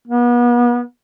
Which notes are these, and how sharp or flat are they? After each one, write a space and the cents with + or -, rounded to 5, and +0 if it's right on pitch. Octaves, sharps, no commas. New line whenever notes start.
B3 -35